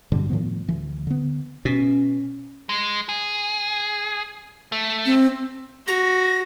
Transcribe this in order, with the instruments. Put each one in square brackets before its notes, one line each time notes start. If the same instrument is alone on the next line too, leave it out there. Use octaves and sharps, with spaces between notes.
[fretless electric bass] G2 B2 D3 G3
A2 D#3 F3 B3
D2 E3
D3 B3
[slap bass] B2 [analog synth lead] C#4
[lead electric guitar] G#3
G#4
A3
[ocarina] C4
[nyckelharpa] F#4 [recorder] A#6